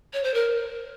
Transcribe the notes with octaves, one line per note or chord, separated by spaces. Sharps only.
C#5
C5
A#4